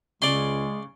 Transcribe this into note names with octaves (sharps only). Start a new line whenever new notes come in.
C#2 C#3 G#3 D5 C6